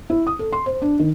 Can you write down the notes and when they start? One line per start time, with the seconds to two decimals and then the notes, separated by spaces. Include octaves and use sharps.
0.10 E4
0.27 D#6
0.39 A4
0.53 C6
0.66 C5
0.82 D4
1.00 D#3